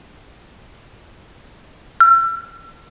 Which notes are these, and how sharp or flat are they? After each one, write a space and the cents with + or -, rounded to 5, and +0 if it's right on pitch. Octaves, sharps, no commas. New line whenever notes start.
E6 +35